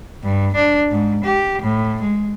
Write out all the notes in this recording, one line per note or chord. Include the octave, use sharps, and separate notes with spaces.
G2
D4
G#2
G4
A2
G#3